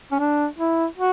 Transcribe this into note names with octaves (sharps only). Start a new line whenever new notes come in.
C#4
D4
E4
F#4